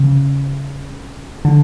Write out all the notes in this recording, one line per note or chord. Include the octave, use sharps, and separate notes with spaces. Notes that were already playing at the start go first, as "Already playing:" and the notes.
Already playing: C#3
D3